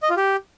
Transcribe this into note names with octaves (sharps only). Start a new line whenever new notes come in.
D#5
F4
G4